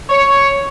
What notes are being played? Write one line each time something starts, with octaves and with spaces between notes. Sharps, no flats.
C#5